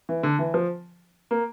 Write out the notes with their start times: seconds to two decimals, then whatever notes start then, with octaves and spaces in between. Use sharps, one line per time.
0.09 E3
0.23 D3
0.39 E3
0.54 F3
1.31 A#3